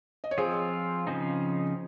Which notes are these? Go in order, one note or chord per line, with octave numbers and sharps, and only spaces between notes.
D#5
C#5
F3 C4 F4 G#4 C5
C#3 F3 C4 D#4